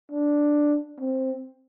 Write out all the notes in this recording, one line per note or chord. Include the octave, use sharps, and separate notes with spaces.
D4
C4